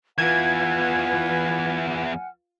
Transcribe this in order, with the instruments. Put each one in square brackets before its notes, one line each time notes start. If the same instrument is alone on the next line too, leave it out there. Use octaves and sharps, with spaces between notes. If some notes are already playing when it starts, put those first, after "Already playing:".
[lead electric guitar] E2 E3 [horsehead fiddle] F4 B4 [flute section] F#5 G#5 F6 [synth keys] G#6